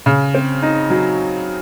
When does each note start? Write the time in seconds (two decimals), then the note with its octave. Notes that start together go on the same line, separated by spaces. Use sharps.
0.06 C#3
0.34 C4
0.62 D#4
0.90 F#3